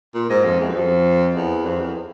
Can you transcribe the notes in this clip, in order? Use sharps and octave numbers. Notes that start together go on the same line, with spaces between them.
A#2
G#2
F2
E2
F#2
F2
E2
F2
E2